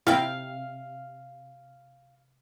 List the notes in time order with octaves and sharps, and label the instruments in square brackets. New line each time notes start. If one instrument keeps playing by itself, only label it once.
[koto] C3 [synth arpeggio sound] E4 G5 [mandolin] F5